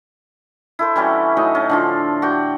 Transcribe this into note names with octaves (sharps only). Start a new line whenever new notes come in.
E4 A4 C5
E3 G3 C#4 F#4
A2 F#3 D#4 D#5
C#4
D3 F3 F4
F#4 D5 G5